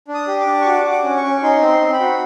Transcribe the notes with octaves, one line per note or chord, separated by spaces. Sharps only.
D4
D#6
G4
D6
D4
C#6
F#4 D6
F#4
D6
C#4
C#6
C#4
D#4 C6
C4
C6
C4
B5
F#4